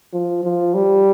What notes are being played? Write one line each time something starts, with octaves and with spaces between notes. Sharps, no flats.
F3
F3
G3